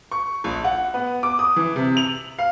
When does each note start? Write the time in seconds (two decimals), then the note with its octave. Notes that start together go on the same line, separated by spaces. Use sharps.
0.12 C#6
0.44 A#1
0.64 F#5
0.94 B3
1.23 D6
1.39 D#6
1.56 E3
1.76 C3
1.97 F7
2.39 F5